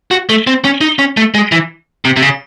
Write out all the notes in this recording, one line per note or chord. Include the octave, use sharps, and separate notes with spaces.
F#4
A3
C4
C#4
D#4
C#4
A3
G#3
E3
C3
C3
C#3